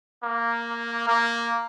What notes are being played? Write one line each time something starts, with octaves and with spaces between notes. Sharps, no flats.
A#3
A#3